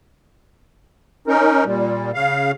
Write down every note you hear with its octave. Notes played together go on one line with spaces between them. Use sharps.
C#4 D#4 A#4
A#2 G3
C#3 F5